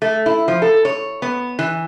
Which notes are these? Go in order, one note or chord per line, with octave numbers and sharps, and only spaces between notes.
A3
E4
F3
A4
C#5
B3
E3